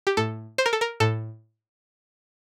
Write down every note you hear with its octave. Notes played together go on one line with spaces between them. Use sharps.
G4
A2 A4
C5
A#4
A4
A#4
A2 A4